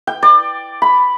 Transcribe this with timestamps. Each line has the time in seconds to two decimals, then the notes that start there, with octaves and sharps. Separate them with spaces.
0.07 G5
0.23 D5
0.82 B5